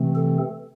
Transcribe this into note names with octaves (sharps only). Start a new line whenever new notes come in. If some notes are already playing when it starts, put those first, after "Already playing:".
Already playing: C3 E3 A3 C4
A4